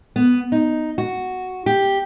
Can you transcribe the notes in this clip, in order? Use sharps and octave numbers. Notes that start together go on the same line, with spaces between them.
B3
D#4
F#4
G4